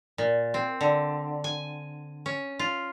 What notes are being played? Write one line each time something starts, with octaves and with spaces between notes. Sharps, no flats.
A#2
C4
D3
G#5
C#4
F4